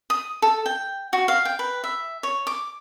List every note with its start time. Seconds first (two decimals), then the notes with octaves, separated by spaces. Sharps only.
0.10 D#6
0.42 A4
0.66 G5
1.13 F#4
1.28 F5
1.45 G5
1.59 B4
1.84 E5
2.23 C#5
2.47 D6